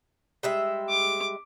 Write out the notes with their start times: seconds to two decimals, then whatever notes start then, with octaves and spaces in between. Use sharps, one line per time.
0.43 G3 G#3 E5
0.89 D6